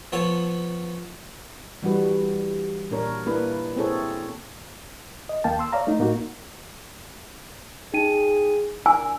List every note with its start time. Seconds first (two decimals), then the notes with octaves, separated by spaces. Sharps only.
0.12 F3 B3 A4 C#5
1.82 E3 G3 D4 F#4 B4
2.91 A#2 A#3 D4 A#4 C#5
3.26 A#3 D4 E4 B4
3.76 A#3 C4 E4 G#4 A4 C#5
5.29 D#5
5.44 D#2 A#3 F5 G5 A5
5.59 C6 E6
5.72 C#5 D5 F5 A#5
5.87 A3 D#4
5.99 A2 A#3 D#4 F#4
7.94 D#4 G#4 G5 D#7
8.86 A#2 D4 G#5 E6